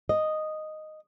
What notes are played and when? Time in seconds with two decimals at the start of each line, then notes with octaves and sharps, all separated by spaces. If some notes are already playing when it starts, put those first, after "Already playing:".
0.09 D#5